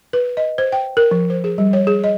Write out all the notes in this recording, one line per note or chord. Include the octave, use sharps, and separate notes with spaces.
B4
D#5
C5
G5
A#4
F3
C5
G#4
G3
C#5
G#4
D#5